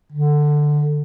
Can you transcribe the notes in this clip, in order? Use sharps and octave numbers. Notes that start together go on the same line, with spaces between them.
D3